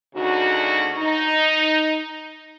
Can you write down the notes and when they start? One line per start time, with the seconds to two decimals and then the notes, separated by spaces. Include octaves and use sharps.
0.15 D2 C#3 D4 D#4 F#4
0.98 D#4